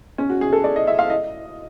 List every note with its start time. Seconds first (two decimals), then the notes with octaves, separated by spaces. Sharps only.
0.18 C#4
0.30 F#4
0.41 G#4
0.53 A4
0.64 D5
0.76 D#5
0.87 E5
0.99 F5
1.10 D#5